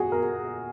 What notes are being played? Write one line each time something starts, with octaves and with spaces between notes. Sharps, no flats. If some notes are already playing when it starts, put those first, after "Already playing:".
Already playing: F#4 G#4
A#4